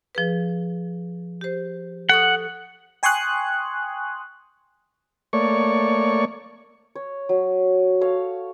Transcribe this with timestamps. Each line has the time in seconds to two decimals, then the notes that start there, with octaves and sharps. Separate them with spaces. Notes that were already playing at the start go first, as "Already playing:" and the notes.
0.15 F3 G#4 B4
1.41 G4 C5
2.09 A4 F#5 C#6 D#6
3.03 G5 G#5 C6 C#6 D#6 F#6
5.33 A3 A#3 C#5 D5 C#6
6.95 C#5
7.29 F#3
8.01 A4 C#5 F5